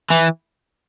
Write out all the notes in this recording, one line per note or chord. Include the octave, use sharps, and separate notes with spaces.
E3